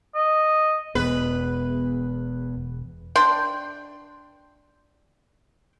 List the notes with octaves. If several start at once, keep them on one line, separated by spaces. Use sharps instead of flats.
D#5
E1 E2 B3 B4
D4 G5 C6